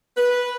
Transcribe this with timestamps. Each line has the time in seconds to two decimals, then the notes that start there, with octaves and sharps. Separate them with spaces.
0.17 B4